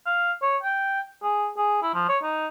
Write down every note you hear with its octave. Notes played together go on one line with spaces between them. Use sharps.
F5
C#5
G5
G#4
G#4
E4
F3
C#5
D#4